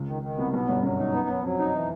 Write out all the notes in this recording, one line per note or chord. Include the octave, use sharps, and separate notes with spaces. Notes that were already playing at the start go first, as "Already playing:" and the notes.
Already playing: C#2 C#3
D#3
D#3
C2 C3 B3
B1 B2 B3
G1 G2 F#3
F#2 F#3
D#4
B3
F#3
F2 F#3
D#4
E3